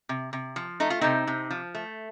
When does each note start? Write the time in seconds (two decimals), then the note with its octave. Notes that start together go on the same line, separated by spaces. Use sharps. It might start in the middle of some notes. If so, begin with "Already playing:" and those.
0.09 C3
0.33 C3
0.56 F3
0.80 A3 D#4
0.90 F4
1.01 C3 C4 D#4
1.27 C3
1.50 F3
1.75 A3